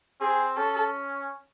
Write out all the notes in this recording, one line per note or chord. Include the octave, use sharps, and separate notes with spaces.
C4 G#4
C#4 A4